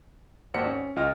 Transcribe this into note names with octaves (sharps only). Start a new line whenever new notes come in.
G#1 D#2 C5 D5 F#5 C#7
C#4
C#2 F4 D#5 F6